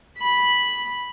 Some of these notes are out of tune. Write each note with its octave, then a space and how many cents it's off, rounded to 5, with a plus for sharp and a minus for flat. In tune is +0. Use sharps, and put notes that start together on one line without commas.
B5 -5